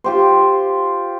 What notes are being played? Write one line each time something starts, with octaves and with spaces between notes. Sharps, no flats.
F4 G4 C5